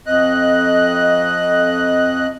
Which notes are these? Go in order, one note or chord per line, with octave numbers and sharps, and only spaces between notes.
F2 D#5 F#6